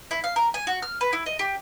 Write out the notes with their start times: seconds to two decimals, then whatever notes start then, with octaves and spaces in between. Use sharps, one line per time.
0.11 E4
0.24 F5
0.36 A#4
0.54 G#5
0.67 F#4
0.82 F6
1.01 B4
1.13 E4
1.26 D#5
1.39 G4